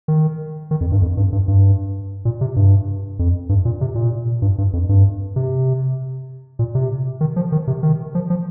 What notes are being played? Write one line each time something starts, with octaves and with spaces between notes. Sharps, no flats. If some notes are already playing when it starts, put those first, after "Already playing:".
D#3
D#3
F2
G2
F2
G2
G2
G2
A#2
C3
G2
F2
G2
A#2
C3
A#2
G2
G2
F2
G2
C3
A#2
C3
D#3
F3
D#3
C3
D#3
F3
F3